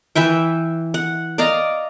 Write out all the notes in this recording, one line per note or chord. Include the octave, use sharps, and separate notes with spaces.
E3 B4 E5 G5
F#5
D5 D#5 F5 A#5